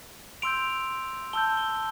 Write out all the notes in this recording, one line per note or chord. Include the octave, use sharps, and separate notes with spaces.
C6 E6 G6 D7 F7
A5 E6 G6 G7
G7